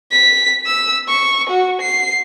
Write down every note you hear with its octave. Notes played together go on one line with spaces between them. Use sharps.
B6
E6
C#6
F#4
C7